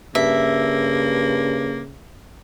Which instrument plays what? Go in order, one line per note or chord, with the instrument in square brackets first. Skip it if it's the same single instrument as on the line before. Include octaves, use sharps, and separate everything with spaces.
[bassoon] G2 [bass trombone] C#3 [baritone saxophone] A#3 [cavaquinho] E5